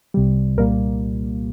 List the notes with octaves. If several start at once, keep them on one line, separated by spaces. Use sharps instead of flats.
C2 C3 G3
C2 A#2 G3 A#3 A#4